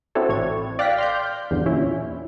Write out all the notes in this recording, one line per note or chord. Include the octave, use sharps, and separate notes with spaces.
C4 D4 E4 F#4 A4 C#5
A1 C#5 G#6
D5 F5 G5 F#6 A#6 B6
C6 F6 G6
E2 G2 D3
A#2 C#4 E4